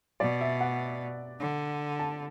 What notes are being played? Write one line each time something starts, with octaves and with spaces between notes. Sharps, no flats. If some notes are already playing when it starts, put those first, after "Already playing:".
B2 D5
E5
F#5
D3
A5